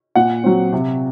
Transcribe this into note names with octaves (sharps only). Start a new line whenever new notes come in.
A#2 F#5
F#3 C4
C3